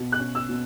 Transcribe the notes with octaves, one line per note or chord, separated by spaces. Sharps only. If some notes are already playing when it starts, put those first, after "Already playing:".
Already playing: B2
F#6
C#4
E6
B2